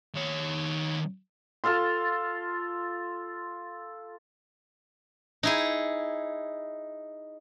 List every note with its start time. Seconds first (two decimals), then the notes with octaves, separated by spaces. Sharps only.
0.15 D#3 C#5
1.64 F4 A4 F5 C6
5.43 D#4 E4 G#4